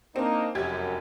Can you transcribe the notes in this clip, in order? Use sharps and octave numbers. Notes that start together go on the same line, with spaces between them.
A#3 C4 D4 D#4
F1 F#2 G4 G#6